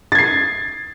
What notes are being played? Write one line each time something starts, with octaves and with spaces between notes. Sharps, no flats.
G#6 A6 C7